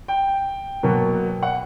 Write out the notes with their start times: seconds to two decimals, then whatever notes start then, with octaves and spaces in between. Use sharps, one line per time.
0.08 G5
0.83 B2 F#3 A#3
1.43 F#5